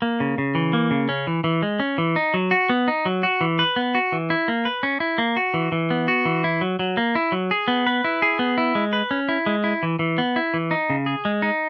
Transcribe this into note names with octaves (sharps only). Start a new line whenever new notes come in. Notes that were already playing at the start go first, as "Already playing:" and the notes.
A#3
C#3
C#3
E3
A#3
C#3
C#4
E3
E3
G#3
C#4
E3
D#4
F#3
F#4
B3
D#4
F#3
F#4
E3
B4
B3
F#4
E3
E4
A#3
B4
C#4
E4
A#3
F#4
E3
E3
B3
F#4
E3
E4
F#3
F#3
A#3
E4
F#3
G#4
B3
B4
E4
G#4
B3
E4
G#3
B4
C#4
E4
G#3
E4
E3
E3
B3
E4
E3
D#4
C#3
G#4
G#3
D#4